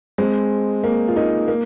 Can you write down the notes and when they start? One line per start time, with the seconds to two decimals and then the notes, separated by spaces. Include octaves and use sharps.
0.18 G#3 C4
0.84 A#3
1.08 F4
1.16 A#3 D#4
1.48 A#3